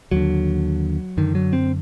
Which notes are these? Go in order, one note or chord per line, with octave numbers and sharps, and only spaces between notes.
D#2 D3 F#3
F#2 D3 D#3
F#3
C4